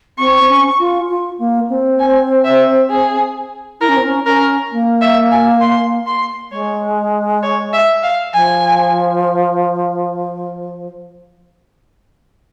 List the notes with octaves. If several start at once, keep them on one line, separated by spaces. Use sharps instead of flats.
C4 C#6
C#4
F4
F4
A#3
C4
G#5
E5
G#4
E4 A#4
C#4
C4
C#4
C#4 A#4
A#3
E5
G#5
C6
C6
G#3 C#5
C#5
E5
F5
F3 G#5